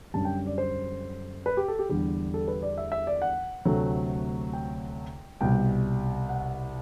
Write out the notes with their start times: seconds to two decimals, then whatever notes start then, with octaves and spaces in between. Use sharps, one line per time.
0.14 F#2 D3 G3 A5
0.25 G5
0.47 D5
0.58 C5
1.46 B4
1.57 G4
1.68 A4
1.79 G4
1.89 E2 D3 G3 G4
2.34 A4
2.48 B4
2.62 D5
2.78 E5
2.92 E5
3.07 D5
3.22 F#5
3.65 D2 C3 F#3 A3
4.53 G5
5.41 C2 B2 G3 G5
6.29 F#5